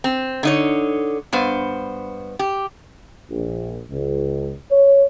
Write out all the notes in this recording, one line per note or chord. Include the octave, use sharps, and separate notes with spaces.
C4
D3 D#4 C#5
G2 B3 C5
G4
A#1
C#2
C#5